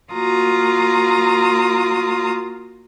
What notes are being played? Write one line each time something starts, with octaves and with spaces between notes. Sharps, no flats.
A#3 F4 F#4 A#5 D#6